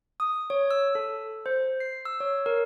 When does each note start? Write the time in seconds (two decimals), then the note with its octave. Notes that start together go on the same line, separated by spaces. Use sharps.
0.20 D#6
0.50 C#5
0.71 E6
0.95 A4
1.46 C5
1.80 C7
2.05 E6
2.20 C#5
2.46 A#4